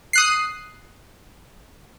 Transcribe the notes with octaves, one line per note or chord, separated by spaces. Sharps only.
D#6 F#6 C7